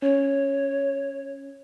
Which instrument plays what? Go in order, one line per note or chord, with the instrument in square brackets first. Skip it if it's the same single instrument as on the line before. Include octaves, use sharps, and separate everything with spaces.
[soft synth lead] C#4 [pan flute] C#5